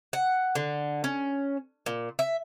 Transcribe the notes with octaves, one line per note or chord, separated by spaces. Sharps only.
F#5
D3
C#4
A#2
E5